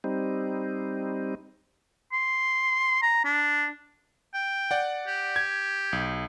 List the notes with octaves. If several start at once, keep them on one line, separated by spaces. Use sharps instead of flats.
G3 C4 D#4
C6
A#5
D4
G5
D5 F#5
G4
G#6
B1